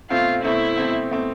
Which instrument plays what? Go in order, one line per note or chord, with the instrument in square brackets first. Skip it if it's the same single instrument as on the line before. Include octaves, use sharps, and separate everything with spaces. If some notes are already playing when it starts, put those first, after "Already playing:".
[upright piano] B2 A3 C4 [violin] F4
[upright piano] B2 A3 C4 [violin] E4
[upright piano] B2 A3 C4
B2 A3 C4